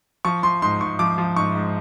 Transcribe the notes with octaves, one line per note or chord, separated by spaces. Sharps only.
F3 C#6
F3 C6
G#2 C6
G#2 C#6
F3 D6
F3
G#2 C#6
G#2